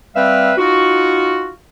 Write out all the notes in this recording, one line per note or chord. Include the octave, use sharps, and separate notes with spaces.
G3 C4 B4 E5 F5
D#4 F4 F#4